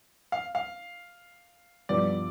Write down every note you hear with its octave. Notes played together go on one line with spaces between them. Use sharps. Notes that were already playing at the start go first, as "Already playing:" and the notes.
F5
F5
G2 F3 B3 E4 D5